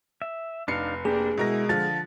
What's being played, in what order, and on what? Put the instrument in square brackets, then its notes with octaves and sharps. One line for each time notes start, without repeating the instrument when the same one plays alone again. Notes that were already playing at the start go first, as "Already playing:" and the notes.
[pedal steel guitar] E5
[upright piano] F1 C7 C#7 [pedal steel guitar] D4 D#4 F5
[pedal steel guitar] A#3 G4 [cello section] D4 [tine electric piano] G#4
[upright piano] B2 A#4 A#6 [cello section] G#3 [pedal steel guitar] E4
[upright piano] D3 F3 F4 [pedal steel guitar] A5